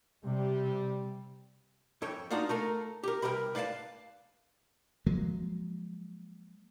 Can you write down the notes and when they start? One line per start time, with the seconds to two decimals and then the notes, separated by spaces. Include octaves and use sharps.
0.24 C3 G3
2.02 F2 A4 C#5 G5
2.31 D4 D#4 F4 F#4 D5 F5
2.49 A3 A4 A#4
3.04 G4 A#4
3.22 C2 A#4 B4 G5 B5
3.55 B4 D5 F5 G5 A5
5.06 F3 F#3 G#3 A#3